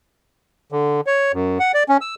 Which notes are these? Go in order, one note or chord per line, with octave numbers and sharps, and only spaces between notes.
D3
C#5
F#2
F#5
D5
C#4
E6